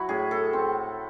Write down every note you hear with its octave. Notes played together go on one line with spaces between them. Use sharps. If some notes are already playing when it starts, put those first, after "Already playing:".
Already playing: F#3 E4 F#4
A2 G#4
A4
C4